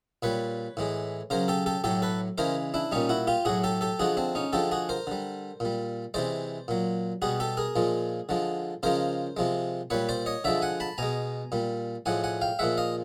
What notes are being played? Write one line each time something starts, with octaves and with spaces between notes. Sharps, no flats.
A#2 G3 B4 C#5
A2 E3 G#3
C#3 F#3 A#4 C5
G4 A4
G4 A4
A2 F#3 G4 A4
A4 B4
C#3 E3 G#3 A#4 C5
D4 E4
A#2 G3 C#4 D#4
E4 F#4
F4 G4
A2 F#3 F#4 G#4
G4 A4
G4 A4
D3 F3 G#3 F#4 G#4
C4 D4
C#4 D#4
D3 F3 G#3 G4 A4
F#4 G#4
A#4 C5
D3 G3
A#2 G3
C3 E3 G#3 C5 D5
A#2 F#3
B2 G3 F#4 G#4
G4 A4
G#4 A#4
A#2 F3 G#3
D3 F3 G#3
C#3 F3 G#3 A#4 C5
C3 F3 G#3
A#2 G3 B4 C#5
C5 D5
C#5 D#5
D3 F3 G#3 D5 E5
F#5 G#5
A5 B5
B2 G#3 G#5 A#5
A#2 G3
A2 F3 G#3 F#5 G#5
F#5 G#5
F5 G5
A#2 F3 G#3 E5 F#5
D#5 F5